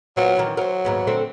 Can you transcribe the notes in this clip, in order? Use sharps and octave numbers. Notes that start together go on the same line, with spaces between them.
F#3 B3 C4 F4
D#3 E3 C#4
F#3 A#4 C5
D#2 G#2 B3
D3 A3 C4